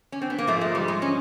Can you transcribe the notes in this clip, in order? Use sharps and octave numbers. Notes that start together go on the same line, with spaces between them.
C#4
C4
B3
A#3
G#2 F3 A3
G#3
G3
G#3
C#4